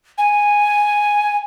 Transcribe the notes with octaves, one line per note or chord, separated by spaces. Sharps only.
G#5